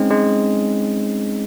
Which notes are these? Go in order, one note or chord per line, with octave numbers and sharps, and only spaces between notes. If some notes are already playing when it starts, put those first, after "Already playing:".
Already playing: G#3 C4 C#4 D#4
G#3